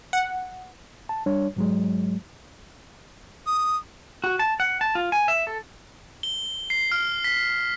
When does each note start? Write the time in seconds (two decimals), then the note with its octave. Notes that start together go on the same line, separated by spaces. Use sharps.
0.13 F#5
1.09 A5
1.26 G3 D4 C#5
1.56 G#2 F#3 G#3
3.47 D#6
4.24 F#4
4.39 A5
4.60 F#5
4.81 A5
4.95 F4
5.12 G#5
5.28 E5
5.47 A4
6.23 G7
6.70 C7
6.92 F6
7.24 B6